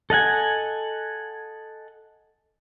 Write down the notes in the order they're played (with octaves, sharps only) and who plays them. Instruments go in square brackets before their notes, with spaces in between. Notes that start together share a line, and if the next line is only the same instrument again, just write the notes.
[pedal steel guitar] A4 D#5 F#5 G#5